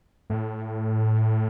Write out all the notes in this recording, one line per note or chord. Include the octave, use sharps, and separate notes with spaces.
A2